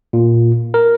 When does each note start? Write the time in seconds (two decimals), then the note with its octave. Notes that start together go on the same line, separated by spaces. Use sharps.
0.13 A#2
0.74 A#4